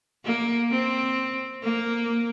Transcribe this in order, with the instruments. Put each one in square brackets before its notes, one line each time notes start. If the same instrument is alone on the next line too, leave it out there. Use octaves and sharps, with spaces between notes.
[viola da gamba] A#3
C4
A#3